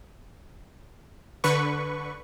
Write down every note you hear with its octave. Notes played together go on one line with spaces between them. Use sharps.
D3 B4 C#6